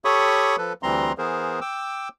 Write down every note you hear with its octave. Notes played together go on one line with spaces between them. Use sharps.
G4 A4 C#5 B5 C#6 D#6
F3 A4 B4
D2 E3 G3 C4 A#5 C6
E3 B3 G#4 A#4 C5
G5 D6 E6